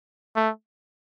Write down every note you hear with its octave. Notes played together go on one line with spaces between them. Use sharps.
A3